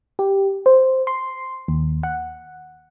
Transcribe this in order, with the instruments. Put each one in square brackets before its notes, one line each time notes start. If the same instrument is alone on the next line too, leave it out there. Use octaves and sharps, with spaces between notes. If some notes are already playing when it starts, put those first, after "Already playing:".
[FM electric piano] G4
C5
C6
D#2
F#5